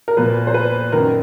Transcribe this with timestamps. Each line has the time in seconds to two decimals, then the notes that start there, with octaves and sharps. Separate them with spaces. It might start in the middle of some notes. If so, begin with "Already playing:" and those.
0.08 A#4
0.17 A#2 F3 B4
0.47 C5
0.54 B4
0.92 F#2 D#3 A#4